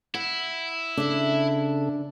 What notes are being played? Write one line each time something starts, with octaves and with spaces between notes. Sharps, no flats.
E4 F#5
C#3 D4 A4 E5